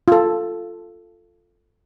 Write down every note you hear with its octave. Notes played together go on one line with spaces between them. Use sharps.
F4 A4